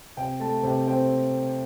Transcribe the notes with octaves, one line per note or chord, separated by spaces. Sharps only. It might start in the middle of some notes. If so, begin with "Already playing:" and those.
C3 G5
A3 A5
C3 G5
C4 G5